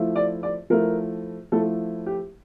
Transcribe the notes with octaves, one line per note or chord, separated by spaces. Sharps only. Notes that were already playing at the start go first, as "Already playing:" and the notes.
Already playing: F3 A3 E4
D5
D5
F3 A3 E4 A#4
F3 A3 E4 A4
G4